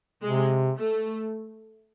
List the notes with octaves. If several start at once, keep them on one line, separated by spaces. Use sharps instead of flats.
C3 G#3
A3